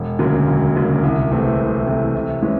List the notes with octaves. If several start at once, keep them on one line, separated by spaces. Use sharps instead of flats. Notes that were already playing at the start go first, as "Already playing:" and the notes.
Already playing: E1
D2 C#3 F#3 A#3
E1
D2 C#3 F#3 A#3
C2
C3 E3 A3 C4
C2
C3 E3 A3 C4
C3
E3 G#3 C#4